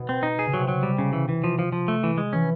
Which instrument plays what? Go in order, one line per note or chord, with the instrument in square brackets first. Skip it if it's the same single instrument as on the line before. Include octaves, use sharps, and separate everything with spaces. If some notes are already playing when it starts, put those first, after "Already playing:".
Already playing: [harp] B2
[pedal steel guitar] C4
D#4
G#4
[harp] C#3
[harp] C3 [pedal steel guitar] F#3
[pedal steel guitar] F#3
G3
C#3
E3
E3
F3
F3
F3
A3
E3
G#3
[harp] E3 [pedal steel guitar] C#4